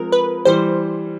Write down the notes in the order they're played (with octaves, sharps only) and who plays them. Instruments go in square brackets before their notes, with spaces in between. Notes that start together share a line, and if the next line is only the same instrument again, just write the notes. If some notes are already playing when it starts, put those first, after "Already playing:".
Already playing: [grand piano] F3 G#3 C4 [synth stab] A#4
[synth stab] B4
[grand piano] E3 G3 [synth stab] C5